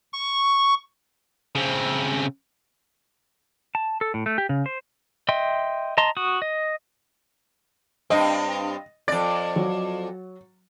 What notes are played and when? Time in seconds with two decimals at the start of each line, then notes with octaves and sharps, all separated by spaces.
0.13 C#6
1.55 C#3 C4
3.75 A5
4.01 A4
4.14 A2
4.26 A3
4.38 G4
4.49 C#3
4.66 C5
5.29 D#5 E5 G5 C6
5.98 D#5 A5 A#5 C6
6.17 F#4 D#6
6.42 D#5
8.10 G2 C4 D#5
9.08 F2 D5 A6
9.56 F#3